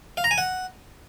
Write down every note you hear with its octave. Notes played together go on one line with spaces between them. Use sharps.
F5
A#5
G#5
F#5